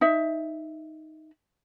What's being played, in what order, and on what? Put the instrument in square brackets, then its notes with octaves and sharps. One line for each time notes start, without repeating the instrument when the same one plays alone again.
[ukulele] D#4 E5